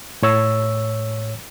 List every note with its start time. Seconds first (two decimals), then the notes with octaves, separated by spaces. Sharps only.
0.22 A2 C#5 E6